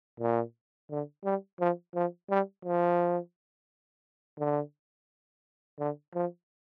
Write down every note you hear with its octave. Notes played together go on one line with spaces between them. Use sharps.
A#2
D3
G3
F3
F3
G3
F3
D3
D3
F3